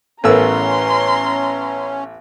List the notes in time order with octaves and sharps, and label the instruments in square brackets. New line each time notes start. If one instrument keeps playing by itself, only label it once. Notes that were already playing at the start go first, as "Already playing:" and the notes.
[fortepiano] A1 B3 E6 [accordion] C#4 [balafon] A4 A#4 [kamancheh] A#5 C6